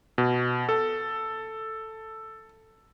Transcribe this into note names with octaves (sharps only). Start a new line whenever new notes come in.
B2
A4